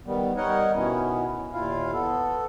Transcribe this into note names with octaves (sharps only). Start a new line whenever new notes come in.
D#3 G3 B3
G3 D#4 A#4 C#5 D#5 F#5
B2 D#3 B3 C#4 E4
D#2 A#2 E4 F4 F5
B3 A4